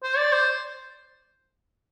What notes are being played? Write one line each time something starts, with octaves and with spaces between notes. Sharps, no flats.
C5
D5
C5